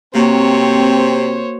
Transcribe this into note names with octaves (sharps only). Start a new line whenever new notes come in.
C3 A#3 C4 F#4 C5 C#5